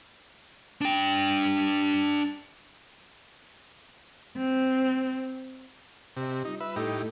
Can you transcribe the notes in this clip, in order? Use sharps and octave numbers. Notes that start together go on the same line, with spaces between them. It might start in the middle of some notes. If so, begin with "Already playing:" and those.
D4 G5
C4
C3 G4 D#5
G3 D#4 F4
B4 E5
A2 A3 D#4 E4 G4 A4